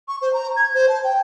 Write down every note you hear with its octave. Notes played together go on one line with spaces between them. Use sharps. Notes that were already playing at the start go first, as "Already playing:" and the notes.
C#6
C5
A#5
G#6
C5
A5
G5